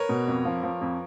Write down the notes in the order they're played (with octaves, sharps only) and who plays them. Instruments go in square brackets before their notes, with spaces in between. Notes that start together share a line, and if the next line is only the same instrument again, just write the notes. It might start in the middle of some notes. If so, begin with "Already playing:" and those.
Already playing: [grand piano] A#4 B4 C#5
[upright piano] B2
F2
F3
F3
F2